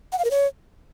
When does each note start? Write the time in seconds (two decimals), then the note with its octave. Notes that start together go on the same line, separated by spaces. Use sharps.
0.12 F#5
0.18 F5
0.25 A#4
0.31 C#5